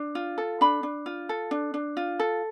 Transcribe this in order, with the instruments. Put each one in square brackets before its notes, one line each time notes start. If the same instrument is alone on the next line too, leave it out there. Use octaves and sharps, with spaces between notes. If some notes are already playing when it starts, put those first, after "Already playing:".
Already playing: [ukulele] D4
F4
A4
D4 B5
D4
F4
A4
D4
D4
F4
A4